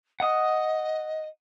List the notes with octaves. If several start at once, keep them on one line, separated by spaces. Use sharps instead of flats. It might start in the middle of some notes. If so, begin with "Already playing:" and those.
D#5 F#5 D#6